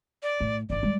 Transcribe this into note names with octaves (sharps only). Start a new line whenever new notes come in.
D5
A2
G#1 D3 D5
G3 G#3